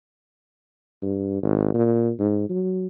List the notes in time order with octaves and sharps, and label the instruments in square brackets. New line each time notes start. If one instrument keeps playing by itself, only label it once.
[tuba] G2
G#1
A#2
G#2
F#3